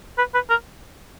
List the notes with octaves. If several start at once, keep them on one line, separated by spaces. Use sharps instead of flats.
B4
B4
A#4